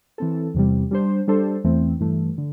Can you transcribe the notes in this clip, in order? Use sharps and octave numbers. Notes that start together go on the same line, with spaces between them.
E3 C4 A4
E2 C3 G3
G3 D4 C5
G3 D4 A4 C5
E2 E3 A3 C4
G2 E3 A3
D3